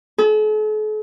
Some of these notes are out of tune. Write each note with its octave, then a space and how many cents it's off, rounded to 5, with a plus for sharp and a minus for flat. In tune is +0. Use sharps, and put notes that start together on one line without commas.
A4 -45